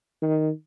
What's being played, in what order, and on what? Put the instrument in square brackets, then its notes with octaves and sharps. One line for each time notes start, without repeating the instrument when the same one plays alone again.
[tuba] D#3